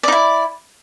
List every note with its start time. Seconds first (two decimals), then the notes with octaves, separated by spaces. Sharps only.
0.03 D5
0.08 D#4
0.12 E4